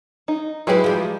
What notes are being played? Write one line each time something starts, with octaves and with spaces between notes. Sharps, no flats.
D#4
F#3 G#3 E4 G4 G#4 B4
F3 G3